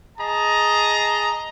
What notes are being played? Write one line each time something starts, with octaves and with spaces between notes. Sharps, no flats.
G#4 D#5 A5 A#5